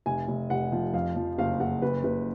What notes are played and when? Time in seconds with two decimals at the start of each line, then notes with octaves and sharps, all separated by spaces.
0.06 F1 G#5
0.28 F1
0.50 F1 F#5
0.72 F3
0.94 F2 F5
1.16 F3
1.38 F#1 F5
1.60 F#1 F#5
1.82 F#1 B4
2.04 F#1 B4